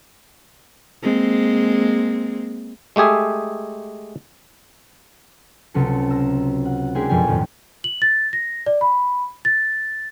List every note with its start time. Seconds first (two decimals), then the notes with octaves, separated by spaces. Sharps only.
1.03 G#3 A#3 C4
2.96 G#3 A3 G4 G#4 E5
5.74 C#2 C3 F#3 A4 C#7
6.11 A#5 E6
6.65 F#5
6.95 G#3 A#3 D4 E4 G4 G#4
7.09 F#1 F2 B2 F3 G5 G#5
7.28 D#2 A2
7.84 F#7
8.02 A6
8.33 A#6
8.66 D5
8.81 B5
9.45 A6